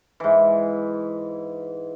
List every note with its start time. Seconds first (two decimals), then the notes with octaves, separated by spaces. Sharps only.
0.20 G#2 E3